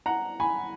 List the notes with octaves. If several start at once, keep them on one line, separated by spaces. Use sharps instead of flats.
F#5 A#5
G#5 B5